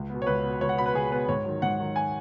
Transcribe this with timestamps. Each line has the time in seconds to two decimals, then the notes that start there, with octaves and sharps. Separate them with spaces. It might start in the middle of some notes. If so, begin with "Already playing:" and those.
Already playing: C#2
0.10 B2 B3
0.22 C#5
0.27 C#2 B4
0.43 B2 B3
0.61 C#2 C#5
0.69 F#5
0.78 B2 B3 B5
0.86 B4
0.94 C#2 G#4
1.12 B2 B3 B4
1.29 G#2 C#5
1.46 D#3 F#3
1.62 G#2 F#5
1.79 D#3 F#3
1.96 G#5